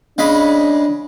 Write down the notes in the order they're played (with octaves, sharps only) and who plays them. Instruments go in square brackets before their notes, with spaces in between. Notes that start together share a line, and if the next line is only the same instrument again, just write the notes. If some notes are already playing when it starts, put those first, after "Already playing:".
[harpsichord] C#3 G#3 B5 [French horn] D4